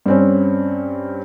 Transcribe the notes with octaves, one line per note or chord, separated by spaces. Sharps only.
G2 C4 C#4